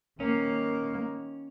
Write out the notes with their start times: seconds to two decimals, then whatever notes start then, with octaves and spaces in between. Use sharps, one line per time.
0.20 D#3 A#3 C#4